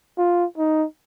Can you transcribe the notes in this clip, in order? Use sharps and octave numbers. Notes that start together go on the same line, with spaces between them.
F4
D#4